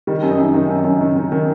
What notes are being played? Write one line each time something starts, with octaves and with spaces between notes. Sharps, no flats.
D#3 G3
F#2
D#4
F#2
D#3
F#2
F#2
D#3
D#3
D#3